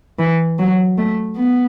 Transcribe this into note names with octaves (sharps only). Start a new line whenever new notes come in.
E3
F#3
A3
B3